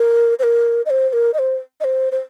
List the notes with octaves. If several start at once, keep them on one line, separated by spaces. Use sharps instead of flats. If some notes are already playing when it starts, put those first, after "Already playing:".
Already playing: A#4
C5
A#4
D#5
C5
C5
A#4
D#5
C5
D#5
C5
C5